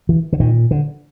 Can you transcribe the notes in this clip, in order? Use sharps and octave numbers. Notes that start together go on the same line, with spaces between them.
E3
D3
A#2 D#3
D3